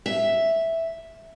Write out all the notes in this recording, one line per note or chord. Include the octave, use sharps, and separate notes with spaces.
E5